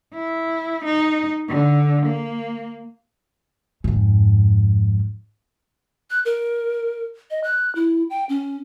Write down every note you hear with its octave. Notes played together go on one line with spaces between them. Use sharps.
E4
D#4
D3
A#3
F2 G#2
F#6
A#4
D#5
F#6
E4
G5
C#4